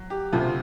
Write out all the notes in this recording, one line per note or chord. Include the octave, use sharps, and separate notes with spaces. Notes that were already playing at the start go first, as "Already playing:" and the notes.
Already playing: F#3
G4
D2 C3 F3 F4